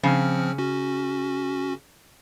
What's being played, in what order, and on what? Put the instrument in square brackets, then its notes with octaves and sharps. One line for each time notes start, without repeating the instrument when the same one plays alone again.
[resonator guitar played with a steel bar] C#3 [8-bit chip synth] F3 C4 F6
[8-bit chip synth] C#4 F#4